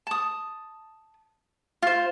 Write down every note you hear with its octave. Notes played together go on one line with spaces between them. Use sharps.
A5 D#6
F4 C5